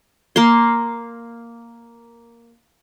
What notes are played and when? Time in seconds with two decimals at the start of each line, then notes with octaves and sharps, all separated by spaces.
0.36 A#3 C6